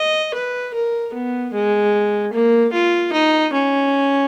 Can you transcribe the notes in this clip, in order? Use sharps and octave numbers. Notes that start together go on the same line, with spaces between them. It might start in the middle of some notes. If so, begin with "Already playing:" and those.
Already playing: D#5
B4
A#4
B3
G#3
A#3
F4
D#4
C#4